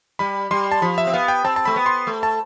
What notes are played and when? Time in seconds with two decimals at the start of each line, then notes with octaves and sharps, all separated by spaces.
0.19 G3 B5
0.51 G3 C6
0.72 A5
0.82 F3 B5
0.98 E5
1.07 C4
1.13 B3 F5
1.28 G5
1.44 C4 A5
1.56 A5
1.65 A3 B5
1.76 B3
1.86 C6
2.07 A3
2.23 A5